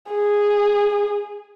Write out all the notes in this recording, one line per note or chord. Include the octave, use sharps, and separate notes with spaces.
G#4